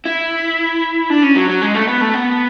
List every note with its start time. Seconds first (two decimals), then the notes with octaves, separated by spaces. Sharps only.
0.05 E4
1.10 D4
1.23 C#4
1.36 F#3
1.49 F#3
1.62 G#3
1.75 A3
1.88 B3
2.01 A3
2.14 B3